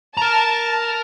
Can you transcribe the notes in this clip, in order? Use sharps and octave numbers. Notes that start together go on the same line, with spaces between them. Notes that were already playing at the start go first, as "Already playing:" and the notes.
A#4 A5 A#5